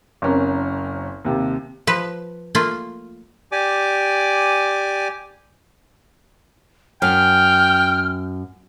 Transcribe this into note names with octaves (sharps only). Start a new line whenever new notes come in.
F#1 C4 C#4 A#4
D#2 C3
F3 B4
A3 A#3 F4
G4 D5 G#5 D6
F#2 G5 F6